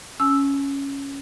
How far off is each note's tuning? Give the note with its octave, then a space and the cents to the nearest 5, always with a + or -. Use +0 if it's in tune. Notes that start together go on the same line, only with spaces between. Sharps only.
C#4 +0 G#5 +35 E6 +0